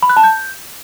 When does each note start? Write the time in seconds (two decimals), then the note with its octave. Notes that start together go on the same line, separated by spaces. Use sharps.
0.03 B5
0.10 F#6
0.17 A5
0.24 G6